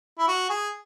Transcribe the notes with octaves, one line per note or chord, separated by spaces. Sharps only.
E4
F#4
G#4